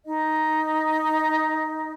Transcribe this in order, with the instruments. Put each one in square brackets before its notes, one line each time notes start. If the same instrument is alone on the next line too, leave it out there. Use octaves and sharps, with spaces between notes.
[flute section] D#4 D#5